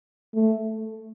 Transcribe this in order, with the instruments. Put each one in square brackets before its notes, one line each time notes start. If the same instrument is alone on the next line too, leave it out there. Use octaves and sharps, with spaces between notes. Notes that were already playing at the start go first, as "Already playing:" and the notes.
[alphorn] A3